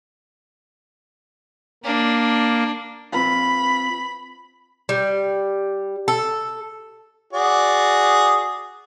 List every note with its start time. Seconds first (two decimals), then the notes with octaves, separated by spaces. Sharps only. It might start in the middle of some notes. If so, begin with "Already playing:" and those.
1.84 A#3 D4
3.13 C4 F4 B4 B5
4.89 G3
6.08 A4
7.33 F#4 G#4 D5